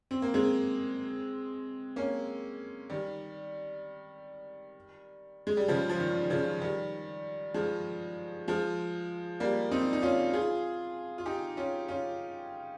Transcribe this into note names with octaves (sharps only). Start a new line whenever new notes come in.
C4
A#3
G#3 C4
A#3 C#4
D#3 G3
G#3
G3
C#3 F3
F3
D#3
C#3 F3
D#3 G3
F3 G#3
F3 G#3
G3 A#3
C4 D#4
D#4
C#4 F4
F4 G#4
F4
D#4 G4
C#4 F4
C#4 F4